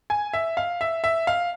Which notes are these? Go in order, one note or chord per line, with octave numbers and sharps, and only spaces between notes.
G#5
E5
F5
E5
E5
F5